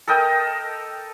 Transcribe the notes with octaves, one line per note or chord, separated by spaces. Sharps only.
A4 A#4 D#5 G5